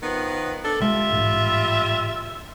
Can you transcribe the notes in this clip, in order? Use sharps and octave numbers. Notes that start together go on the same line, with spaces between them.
D#3 F3 B3
D4 A4
B1 G3 G#3 F4 E5
A1 G#2